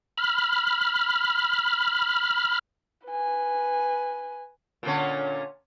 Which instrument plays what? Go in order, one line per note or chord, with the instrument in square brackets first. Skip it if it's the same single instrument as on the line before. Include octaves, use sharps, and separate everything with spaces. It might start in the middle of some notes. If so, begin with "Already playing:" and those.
[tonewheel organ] B5 F6
[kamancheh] B4 G#5
[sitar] A#2 D3 C#4